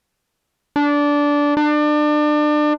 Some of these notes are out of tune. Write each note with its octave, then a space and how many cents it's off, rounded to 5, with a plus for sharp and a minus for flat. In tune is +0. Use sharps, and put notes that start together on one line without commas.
D4 -15
D4 +30